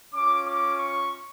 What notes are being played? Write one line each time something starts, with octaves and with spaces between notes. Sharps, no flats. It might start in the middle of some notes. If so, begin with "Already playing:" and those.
C#4 F4 D6
D6
C#6